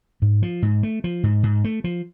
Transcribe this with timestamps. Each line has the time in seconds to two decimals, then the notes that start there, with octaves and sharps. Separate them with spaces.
0.22 G#2
0.42 F3
0.62 G#2
0.83 A3
1.04 F3
1.24 G#2
1.43 G#2
1.64 A3
1.84 F3